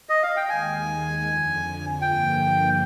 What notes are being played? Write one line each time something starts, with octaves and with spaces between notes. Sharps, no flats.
D#5
F5
G5
D#2 D#3 G#3 G#5
F2 D3 F3
G2 D3 F3 A#3 G5